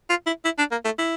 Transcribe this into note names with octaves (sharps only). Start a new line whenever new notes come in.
F4
E4
E4
D4
A#3
A3
E4